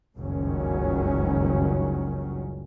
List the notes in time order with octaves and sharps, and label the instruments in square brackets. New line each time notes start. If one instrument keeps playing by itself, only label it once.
[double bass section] F#1 C#2 G2 D#3 F#3 C#4